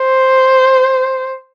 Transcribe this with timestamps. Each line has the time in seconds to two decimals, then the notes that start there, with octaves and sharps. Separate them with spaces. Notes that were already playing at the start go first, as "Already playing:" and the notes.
Already playing: C5